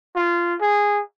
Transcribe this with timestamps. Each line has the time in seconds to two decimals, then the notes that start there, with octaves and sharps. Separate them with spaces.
0.16 F4
0.61 G#4